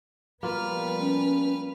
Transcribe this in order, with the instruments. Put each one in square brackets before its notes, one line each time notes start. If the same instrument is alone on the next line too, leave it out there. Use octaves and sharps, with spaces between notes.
[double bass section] F3 G3 B3 [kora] A#3 F4 [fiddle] B4 F6
[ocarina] C#4